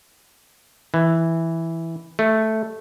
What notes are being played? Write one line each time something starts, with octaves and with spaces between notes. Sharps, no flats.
E3
A3